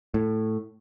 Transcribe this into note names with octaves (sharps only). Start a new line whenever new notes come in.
A2